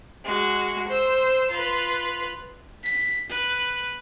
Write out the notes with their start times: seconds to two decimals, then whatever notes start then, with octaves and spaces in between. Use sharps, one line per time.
0.24 G#3 F#4
0.88 C5 E6
1.51 F4 B4
2.84 B6
3.30 B4